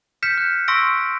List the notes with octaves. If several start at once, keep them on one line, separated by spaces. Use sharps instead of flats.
F6 G6 B6 C#7 E7
F#6
C6 C#6 E6 A#6 B6 D7